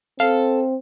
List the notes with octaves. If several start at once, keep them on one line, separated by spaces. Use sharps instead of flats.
C4 A4 F5